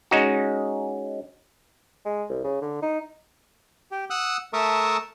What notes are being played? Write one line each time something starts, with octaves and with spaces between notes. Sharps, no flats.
G#3 C#4 D#4 F#4
G#3
C2
C#3
D3
D#4
G4
F#5 D#6 E6 F#6
A3 A#4 E5 A5 C#6 D#6